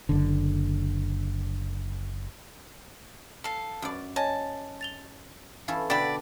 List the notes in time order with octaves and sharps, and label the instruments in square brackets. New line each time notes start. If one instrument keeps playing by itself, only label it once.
[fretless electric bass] F#1 D3
[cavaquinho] A4 F5
[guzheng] F#2 D5
[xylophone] C#5 D#5 G#5 [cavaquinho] A5
[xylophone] A6 F7 G7
[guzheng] E3 C#4 A4 [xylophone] F5
[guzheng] B2 D3 A4 [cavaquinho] D5 B5 [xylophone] G5 A6 B6